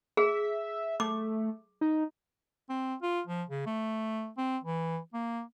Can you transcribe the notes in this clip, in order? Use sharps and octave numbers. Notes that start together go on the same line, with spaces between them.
G#4 E5
A3 D6
D#4
C4
F4
F3
C#3
A3
C4
E3
A#3